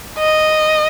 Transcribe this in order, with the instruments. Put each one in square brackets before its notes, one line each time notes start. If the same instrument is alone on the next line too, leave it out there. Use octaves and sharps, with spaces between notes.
[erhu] D#5